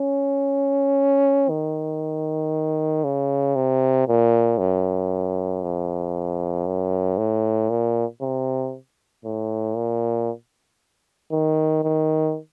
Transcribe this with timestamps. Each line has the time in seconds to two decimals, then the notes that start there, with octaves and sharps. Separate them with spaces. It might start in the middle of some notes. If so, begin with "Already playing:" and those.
Already playing: C#4
1.49 D#3
3.04 C#3
3.55 C3
4.08 A#2
4.58 F#2
5.62 F2
6.66 F#2
7.17 A2
7.70 A#2
8.21 C3
9.25 A2
9.76 A#2
11.31 D#3
11.83 D#3